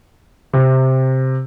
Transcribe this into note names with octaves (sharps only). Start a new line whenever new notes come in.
C3